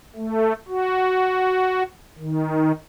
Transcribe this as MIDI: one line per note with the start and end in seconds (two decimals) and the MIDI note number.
0.16 0.53 57
0.68 1.83 66
2.19 2.72 51